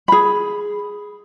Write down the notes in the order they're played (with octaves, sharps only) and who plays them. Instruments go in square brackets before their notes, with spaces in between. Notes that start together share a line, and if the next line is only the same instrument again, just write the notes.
[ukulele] G#4 B5